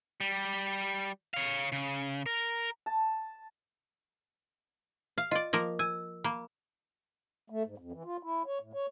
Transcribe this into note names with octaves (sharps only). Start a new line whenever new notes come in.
G3
C#5 F5
C#3
A#4
A5
F5
F4 D5 D#5
F3 A#3 A#4
G#5 E6
A#3 B5
A3
G#2
F2
E3
F4
E4
C#5
A2
C#5